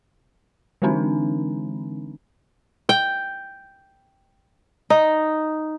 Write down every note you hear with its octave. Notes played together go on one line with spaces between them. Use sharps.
D3 E3 G#3 C4 D4 D#4
G5
D#4